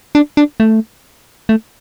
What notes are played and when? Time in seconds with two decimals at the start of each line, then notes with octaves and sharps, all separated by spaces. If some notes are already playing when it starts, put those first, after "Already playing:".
0.15 D4
0.37 D4
0.60 A3
1.49 A3